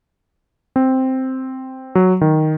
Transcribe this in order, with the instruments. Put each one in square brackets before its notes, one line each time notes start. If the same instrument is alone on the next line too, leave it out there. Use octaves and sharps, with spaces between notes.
[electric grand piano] C4
F#3
D#3